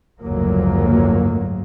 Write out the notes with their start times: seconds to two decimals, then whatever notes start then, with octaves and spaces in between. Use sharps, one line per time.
0.22 F#1 D2 G#2 F3 F#3 A#3